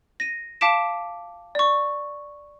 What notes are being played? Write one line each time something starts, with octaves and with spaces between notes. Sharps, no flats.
A#6 D#7
F5 A5 D6 B6 D7 E7
D5 C#6